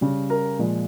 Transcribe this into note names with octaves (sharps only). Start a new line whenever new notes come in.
C#3 G3
A#4
A#2 F3 G#3